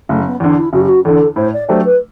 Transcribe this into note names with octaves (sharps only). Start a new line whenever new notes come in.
F#1 A3
B3
E2 D3 C4
E4
F#1 F#4
G4
F#4
E2 D3 A4
A2 C5
D5
F#3 A3 D4 G4 C5
B4